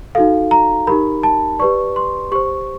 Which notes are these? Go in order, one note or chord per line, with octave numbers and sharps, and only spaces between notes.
D#4 F#4 A4 F5
A#5
D#4 G4 A#4 B5
A5
G4 B4 D5 C#6
C6
G4 C5 C#6